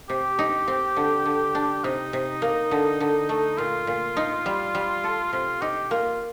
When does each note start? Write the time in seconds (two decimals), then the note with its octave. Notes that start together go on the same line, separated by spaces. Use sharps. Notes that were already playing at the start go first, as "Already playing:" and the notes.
0.09 C3 G4
0.39 D#4
0.68 C4
0.96 D3
1.26 D3
1.55 D4
1.84 C3 D#4
2.13 C3
2.42 A#3
2.71 D3
3.00 D3
3.29 A3
3.58 A#2 F4
3.87 A#2
4.17 D#4
4.46 G3
4.75 G3
5.04 A4
5.33 C3 F4
5.62 D#4 G4
5.91 A#3 F4